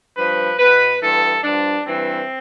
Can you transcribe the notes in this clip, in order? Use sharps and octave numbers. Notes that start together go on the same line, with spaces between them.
G2 F3 B4
B2 B4
G2 E3 A4
G2 F3 D4
G2 E3 C4